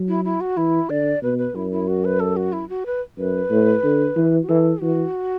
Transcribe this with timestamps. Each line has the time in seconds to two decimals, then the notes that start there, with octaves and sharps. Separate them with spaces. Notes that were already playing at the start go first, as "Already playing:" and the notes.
Already playing: F#3
0.08 E4
0.25 E4
0.41 F#4
0.57 E3 E4
0.90 D3 D5
1.22 B2 B4
1.38 B4
1.55 F#2 E4
1.71 E4
1.88 F#4
2.05 B4
2.20 A4
2.37 F#4
2.53 E4
2.69 F#4
2.86 B4
3.18 F#2 B4
3.51 A2
3.84 D3
4.16 E3
4.43 F#4
4.49 E3 A4
4.81 E3 F#4